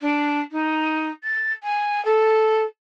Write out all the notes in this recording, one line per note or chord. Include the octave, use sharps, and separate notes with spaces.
D4
D#4
A6
G#5
A4